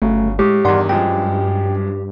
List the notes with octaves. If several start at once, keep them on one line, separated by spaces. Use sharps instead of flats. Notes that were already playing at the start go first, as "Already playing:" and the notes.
G1 C#3 F#3 A3
A2 G#3 G4 D#6
E2 G2 D#3 D5 F#5 C6
F#2 F3 G#3 G5